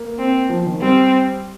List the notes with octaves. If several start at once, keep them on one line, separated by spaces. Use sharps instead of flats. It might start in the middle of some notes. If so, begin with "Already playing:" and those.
Already playing: A#3
C4
F3
D#3
G3 C4